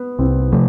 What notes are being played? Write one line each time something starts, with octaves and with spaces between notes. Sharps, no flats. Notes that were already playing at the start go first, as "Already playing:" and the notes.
Already playing: B3
C2 C4
C3 F3 A3